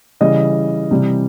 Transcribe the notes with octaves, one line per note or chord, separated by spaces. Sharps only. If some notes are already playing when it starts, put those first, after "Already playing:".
C#3 E3 G3 D#5
C3 E3 G3